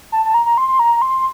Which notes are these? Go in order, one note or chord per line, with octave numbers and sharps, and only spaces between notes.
A5
A5
A#5
A#5
C6
C6
A#5
C6